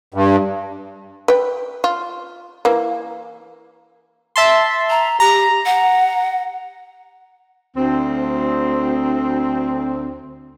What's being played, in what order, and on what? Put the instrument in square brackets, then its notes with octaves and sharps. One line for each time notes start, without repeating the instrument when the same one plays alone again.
[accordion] G2
[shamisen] B4 G5
F4
E3 A#3
[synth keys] E5 A5 C6
[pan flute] A#5
[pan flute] G4 [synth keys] A#5
[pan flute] F#5
[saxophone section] D2 C4